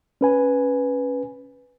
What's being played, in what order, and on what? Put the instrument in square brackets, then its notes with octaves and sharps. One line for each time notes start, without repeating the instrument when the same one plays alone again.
[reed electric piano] C#4 B4 G#5